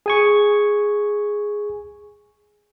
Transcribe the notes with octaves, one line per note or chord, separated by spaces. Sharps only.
G#4 G#5 C#6